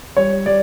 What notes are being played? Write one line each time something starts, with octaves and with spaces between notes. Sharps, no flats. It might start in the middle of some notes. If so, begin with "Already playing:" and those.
G3 C#5
G3 D5